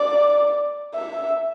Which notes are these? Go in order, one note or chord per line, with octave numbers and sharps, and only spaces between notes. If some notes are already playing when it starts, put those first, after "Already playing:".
Already playing: D5
E5